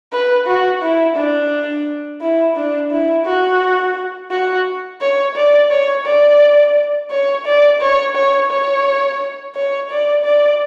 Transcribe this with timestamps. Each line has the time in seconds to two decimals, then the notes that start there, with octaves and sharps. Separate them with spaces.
0.12 B4
0.47 F#4
0.82 E4
1.16 D4
2.22 E4
2.56 D4
2.91 E4
3.26 F#4
4.31 F#4
5.01 C#5
5.36 D5
5.71 C#5
6.06 D5
7.11 C#5
7.45 D5
7.81 C#5
8.15 C#5
8.51 C#5
9.55 C#5
9.90 D5
10.24 D5